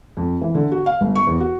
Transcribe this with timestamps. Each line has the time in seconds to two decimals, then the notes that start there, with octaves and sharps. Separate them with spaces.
0.17 F2
0.41 E3
0.55 D3
0.72 F#4
0.86 F5
1.01 G1
1.15 C#6
1.27 E2
1.40 F#4